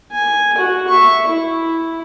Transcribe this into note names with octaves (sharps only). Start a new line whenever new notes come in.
G#5
F#4
E5 C#6
E4